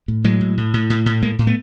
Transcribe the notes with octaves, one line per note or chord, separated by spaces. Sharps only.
A2
A2 F#3 G#3
A2
A2
A2
A2
A2
A2 G#3 A#3
A2
A3 B3